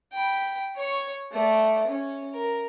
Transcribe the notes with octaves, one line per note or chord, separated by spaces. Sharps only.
G5 B5
C#5 C#6
A3 D5
C#4
A#4